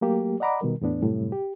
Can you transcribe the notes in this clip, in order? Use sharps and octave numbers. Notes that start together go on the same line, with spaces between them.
F#3 A3 A#3 G4
D5 D#5 F#5 A#5 B5 D6
B2 D#3 G3 A#4
E2 A2 B3 D4
F#2 A2 C3 G3
G4